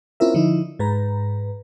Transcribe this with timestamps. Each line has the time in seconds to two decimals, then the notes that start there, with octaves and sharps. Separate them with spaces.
0.20 C4 C#4 E4 F4 A#4 E5
0.34 D3 F3 D#4 E4
0.79 G#2 B4 A#5